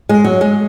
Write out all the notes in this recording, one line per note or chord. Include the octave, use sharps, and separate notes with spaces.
G#3
F#3
G#3